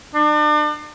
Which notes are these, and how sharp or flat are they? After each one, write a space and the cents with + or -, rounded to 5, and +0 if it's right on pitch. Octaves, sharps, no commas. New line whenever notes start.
D4 +40